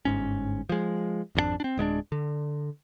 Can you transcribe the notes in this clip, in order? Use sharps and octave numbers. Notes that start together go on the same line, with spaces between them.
G1 G#2 C#4
F3 G#3
G#1 F2 F3 D4
C4 D4
D1 G#3 B3 D4
D3